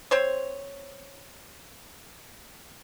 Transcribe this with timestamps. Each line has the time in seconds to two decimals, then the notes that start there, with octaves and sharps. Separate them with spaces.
0.11 C4 C5 C#5